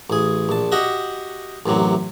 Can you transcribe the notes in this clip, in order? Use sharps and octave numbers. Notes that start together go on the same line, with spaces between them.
A1 G#4
A#1 A5
F#4 G4 D#5 E5 F#5
A1 F#2 C3 F#3